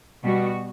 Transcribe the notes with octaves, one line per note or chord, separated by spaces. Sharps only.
B2 G3 B3 F#4